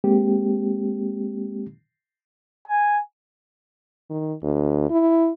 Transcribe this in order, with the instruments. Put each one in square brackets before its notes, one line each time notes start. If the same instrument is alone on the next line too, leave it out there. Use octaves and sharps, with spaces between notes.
[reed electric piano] G#3 A#3 C4 G4
[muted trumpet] G#5
[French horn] D#3
D2
E4